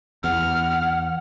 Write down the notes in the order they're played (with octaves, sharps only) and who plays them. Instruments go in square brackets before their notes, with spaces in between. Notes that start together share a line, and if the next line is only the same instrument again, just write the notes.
[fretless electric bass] E2 [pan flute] F#5 [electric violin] F6